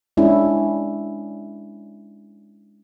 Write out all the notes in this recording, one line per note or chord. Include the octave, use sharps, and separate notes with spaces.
G#3 C#4 D4 E4